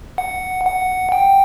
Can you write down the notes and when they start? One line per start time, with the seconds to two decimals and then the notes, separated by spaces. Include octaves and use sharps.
0.18 F#5
0.66 F#5
1.12 G5